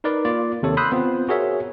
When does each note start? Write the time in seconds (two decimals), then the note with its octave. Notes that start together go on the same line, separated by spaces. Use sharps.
0.04 D#4 A#4 B4 D5
0.25 A#3 F4 D5
0.62 D#2 C3 A4 C#5
0.77 B5 C6 D#6 E6 F#6 G6
0.91 B3 C4 F4 C5
1.29 F#4 G#4 A#4 C#5 E5